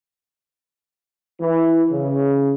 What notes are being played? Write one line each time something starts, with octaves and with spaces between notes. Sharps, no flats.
E3
C#3